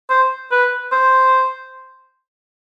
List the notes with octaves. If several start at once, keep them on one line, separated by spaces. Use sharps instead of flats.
C5
B4
C5